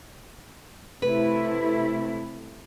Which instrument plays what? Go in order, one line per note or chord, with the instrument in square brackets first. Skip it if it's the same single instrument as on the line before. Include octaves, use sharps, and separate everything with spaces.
[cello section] C3 A3 E4 [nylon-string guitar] B4